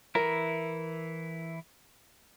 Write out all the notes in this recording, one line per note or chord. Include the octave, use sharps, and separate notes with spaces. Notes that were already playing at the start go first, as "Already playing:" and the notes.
E3 E4 A#4